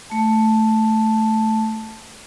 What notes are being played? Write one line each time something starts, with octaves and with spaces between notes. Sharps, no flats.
A3 A5